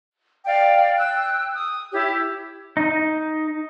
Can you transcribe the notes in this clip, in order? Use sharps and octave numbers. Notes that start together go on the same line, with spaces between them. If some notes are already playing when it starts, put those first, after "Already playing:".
D5 F5 G5
G5 E6 F#6
D#6
E4 G4 C#5
D#4